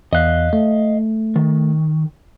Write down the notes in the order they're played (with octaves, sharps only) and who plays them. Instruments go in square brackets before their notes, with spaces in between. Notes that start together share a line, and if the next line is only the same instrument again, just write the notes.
[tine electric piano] E2 F#6 [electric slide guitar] D#5 F5
[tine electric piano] A3
[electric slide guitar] D#3